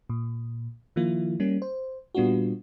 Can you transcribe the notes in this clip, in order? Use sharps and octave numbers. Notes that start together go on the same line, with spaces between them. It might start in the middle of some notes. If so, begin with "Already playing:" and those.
A#2
D#3 F3 A#3 E4 F4
G3 A#3 C#4
C5
A#2 G3 B3 D4 F4 F#4